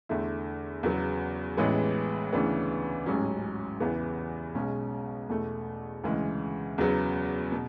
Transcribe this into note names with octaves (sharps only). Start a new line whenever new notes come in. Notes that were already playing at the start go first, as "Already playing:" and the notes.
E2 D3 A3 E4
E2 C#3 F#3 B3
A1 A2 E3 G#3 B3
D2 C#3 E3 B3 D4
A1 G#2 F#3 C#4
E2 C#3 E3 B3
B1 B2 G#3 C#4
E2 B2 A3
D2 C#3 E3 G#3
E2 C#3 F#3 B3
B2